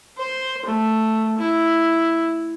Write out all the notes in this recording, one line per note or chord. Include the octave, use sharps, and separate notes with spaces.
C5
A3
E4